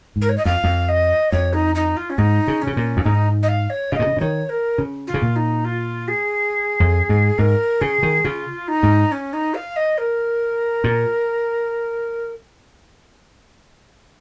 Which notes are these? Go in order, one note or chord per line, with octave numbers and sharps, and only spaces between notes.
G#2
A#4
C#5
D#5
F2 F5
F2
D#5
F2 C#5
D#4
D#4
F4
C#4
G#2 D#4
C#3
C#4
C#3
A#2
F2
G#2 D#4
D#5
F5
C#5
C#3 F5
A#2 D#5
C#3
C#3
D#3 C#5
A#4
C#3
F4
C#3
A#2
D#4
F4
G#4
F2
G#2
G#2 A#4
C#3 G#4
D#3
C#3 F4
D#4
G#2
C#4
D#4
F5
D#5
A#4
A#2